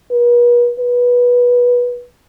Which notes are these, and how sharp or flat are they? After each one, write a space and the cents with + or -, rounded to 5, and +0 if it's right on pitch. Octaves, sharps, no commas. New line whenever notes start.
B4 -45
B4 -20